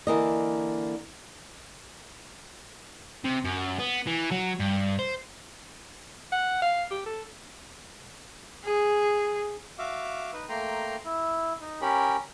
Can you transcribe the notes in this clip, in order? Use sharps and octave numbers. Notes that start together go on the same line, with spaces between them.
D3 E3 A#3 D#5
C3
F#2
B3
E3
F#3
G2
C5
F#5
F5
G4
A4
G#4
F#4 E5 F5 D6
D#4 B4
A3 A#3 G5 A#5 C6
E4
D#4
C#4 G4 A#4 B5